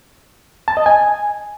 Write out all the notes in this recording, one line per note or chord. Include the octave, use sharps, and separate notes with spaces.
A5
D#5
G#5